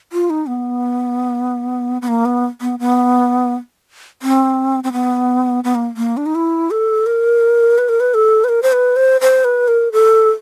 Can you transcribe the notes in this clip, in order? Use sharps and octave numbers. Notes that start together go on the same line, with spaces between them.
F4
D#4
B3
B3
A#3
B3
B3
B3
C4
C4
B3
B3
A#3
A#3
D4
D#4
E4
A4
A#4
B4
A#4
B4
A4
B4
A#4
C5
B4
C5
C5
B4
A#4
A4